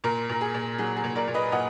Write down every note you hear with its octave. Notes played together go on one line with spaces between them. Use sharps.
A#2 A#4
A#2 A#4
G#4
A#2
F#3 G#4
G#4
A#2
A#4 D5
A#2
B4 D#5
A#2 D#5 F#5